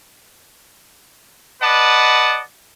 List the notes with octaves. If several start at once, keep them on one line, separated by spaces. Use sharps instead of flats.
B4 D5 D#5 F#5 A5